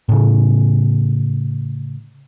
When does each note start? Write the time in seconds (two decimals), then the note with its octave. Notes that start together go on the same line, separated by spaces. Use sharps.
0.09 A2 C#3